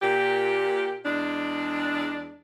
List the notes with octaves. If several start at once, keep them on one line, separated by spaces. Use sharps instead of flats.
A#2 G4
E2 G#3 D4